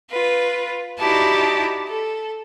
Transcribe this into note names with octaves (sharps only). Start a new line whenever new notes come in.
F4 B4
D#4 E4 F#4 G4 D5 A5
A4